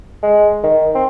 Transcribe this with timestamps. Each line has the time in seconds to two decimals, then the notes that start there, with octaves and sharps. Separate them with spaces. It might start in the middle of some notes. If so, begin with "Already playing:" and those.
0.23 G#3
0.63 D#3
0.95 C4